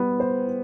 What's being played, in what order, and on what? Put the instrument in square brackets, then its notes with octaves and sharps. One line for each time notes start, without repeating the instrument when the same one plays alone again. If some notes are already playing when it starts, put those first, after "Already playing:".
Already playing: [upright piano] G3 B3
C5